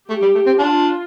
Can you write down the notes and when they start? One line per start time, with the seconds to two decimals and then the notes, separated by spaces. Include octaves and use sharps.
0.09 A3 G4
0.22 G3
0.35 A3
0.46 C4
0.58 D4 F4